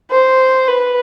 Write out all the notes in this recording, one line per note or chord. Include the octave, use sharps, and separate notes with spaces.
C5
B4